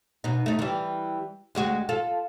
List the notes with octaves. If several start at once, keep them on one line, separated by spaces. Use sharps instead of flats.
B2 D#4
A3 D#4
E3 G3
D2 G#3 F#4
F4 A4